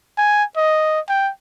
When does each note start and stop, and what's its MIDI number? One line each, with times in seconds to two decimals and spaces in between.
0.18 0.44 80
0.57 1.00 75
1.09 1.31 79